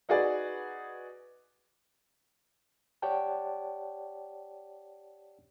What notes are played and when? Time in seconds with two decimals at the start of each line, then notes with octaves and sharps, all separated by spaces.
0.09 D#4 F#4 G#4 B4 D5
3.02 G4 C#5 D5 F#5 G5 A5